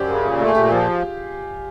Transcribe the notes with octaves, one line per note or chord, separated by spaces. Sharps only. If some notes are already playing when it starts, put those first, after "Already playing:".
Already playing: F#2 G4 C5 D5
C#3
A#2
A3
G#4
A#2 G4
F3 F4